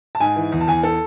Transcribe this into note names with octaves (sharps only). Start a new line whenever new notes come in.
A5
G#2 G#5
E3
E2
A5
E2 G#5
A4